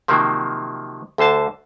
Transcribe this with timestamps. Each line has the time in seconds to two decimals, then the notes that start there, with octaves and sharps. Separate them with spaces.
0.08 C3 D#3 F3 F#3 A#3
1.18 D2 D3 C5 A5